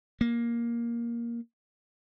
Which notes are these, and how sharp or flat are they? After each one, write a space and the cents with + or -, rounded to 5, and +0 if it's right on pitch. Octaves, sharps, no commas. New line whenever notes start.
A#3 +10